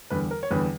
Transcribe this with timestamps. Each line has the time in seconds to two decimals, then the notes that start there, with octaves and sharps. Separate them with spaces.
0.10 E2 D3 G3 B4
0.31 A#4
0.43 C#5
0.50 E2 D3 G3 B4